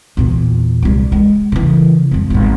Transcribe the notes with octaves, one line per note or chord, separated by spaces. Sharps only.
E2 A#2
C2 G3
G#3
C#3 E3
F2 G3
G#1 B3